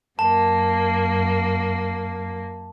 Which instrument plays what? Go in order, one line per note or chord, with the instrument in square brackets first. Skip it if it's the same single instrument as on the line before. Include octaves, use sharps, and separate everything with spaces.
[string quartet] F#2 A#3 [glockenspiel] A5